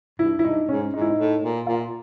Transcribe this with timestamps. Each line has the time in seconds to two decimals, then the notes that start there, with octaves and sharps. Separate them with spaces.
0.19 G2 E4
0.39 E4
0.44 G2 D#4
0.69 G#2 C#4
0.93 G#2 D#4
1.01 E4
1.10 D#4
1.18 A2
1.43 A#2
1.67 A#2 F4